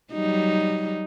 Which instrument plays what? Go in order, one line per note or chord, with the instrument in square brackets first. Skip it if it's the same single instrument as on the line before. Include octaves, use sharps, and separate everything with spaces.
[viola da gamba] F#3 G3 D#4